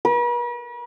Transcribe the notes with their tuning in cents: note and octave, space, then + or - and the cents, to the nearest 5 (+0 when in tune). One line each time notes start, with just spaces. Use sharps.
B4 -45